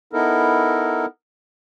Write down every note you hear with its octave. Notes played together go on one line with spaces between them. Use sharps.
B3 D#4 E4 A4 A#4